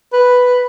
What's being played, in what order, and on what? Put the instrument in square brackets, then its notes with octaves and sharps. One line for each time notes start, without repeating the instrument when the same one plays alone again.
[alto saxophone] B4